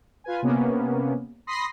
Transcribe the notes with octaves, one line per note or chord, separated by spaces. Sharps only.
F4 B4 G#5
C3 A#3 B3 C#4
B5 C6 D#6 A#6 C7